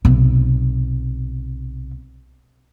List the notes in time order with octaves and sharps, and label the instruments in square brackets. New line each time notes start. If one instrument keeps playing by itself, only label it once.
[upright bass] B1 C3